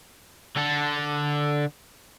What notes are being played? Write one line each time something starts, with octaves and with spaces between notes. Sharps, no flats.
D3 A4